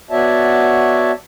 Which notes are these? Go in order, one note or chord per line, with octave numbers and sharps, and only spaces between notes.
B3 F#4 C#5 D5 E5 A5